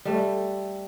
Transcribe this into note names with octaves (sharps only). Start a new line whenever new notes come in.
G3 A3